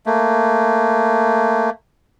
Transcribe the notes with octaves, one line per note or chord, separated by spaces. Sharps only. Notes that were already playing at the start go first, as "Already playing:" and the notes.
A3 A#3